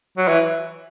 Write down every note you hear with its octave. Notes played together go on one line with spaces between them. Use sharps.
F#3
E3